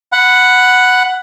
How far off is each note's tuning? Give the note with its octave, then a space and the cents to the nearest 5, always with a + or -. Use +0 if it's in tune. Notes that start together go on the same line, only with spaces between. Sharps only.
F#5 +0 B5 +10